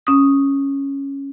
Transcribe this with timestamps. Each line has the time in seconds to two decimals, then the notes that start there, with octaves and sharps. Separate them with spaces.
0.07 C#4 D#6